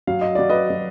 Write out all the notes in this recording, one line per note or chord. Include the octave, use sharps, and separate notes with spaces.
F#3 F5
D#5
F#3 D5
B4 D#5
F#3